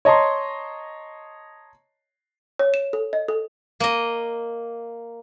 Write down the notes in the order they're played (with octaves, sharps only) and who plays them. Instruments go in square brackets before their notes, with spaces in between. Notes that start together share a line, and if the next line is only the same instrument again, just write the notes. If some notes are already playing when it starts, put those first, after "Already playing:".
[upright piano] C#5 D#5 A5 A#5 C6
[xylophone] C#5
E7
A4
D#5
A4
[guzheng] A#3 D#5